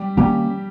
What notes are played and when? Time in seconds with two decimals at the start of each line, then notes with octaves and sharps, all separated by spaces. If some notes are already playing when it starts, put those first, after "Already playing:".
Already playing: G3 G4
0.17 D#3 G3 A#3 C#4 G4